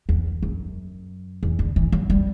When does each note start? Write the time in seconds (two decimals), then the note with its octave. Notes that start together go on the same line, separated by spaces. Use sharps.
0.09 E2
0.43 F#2
1.43 E2
1.59 D3
1.76 E3
1.92 F#3
2.10 G3